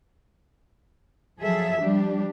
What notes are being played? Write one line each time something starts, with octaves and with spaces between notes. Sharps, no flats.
F3 F#3 G#4 A4 E5
F3 G3 D4 G4